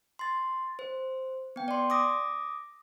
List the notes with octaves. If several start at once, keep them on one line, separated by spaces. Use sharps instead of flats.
C6 A6
C5
B3 G5
D5 C6
D6 D#6 A#6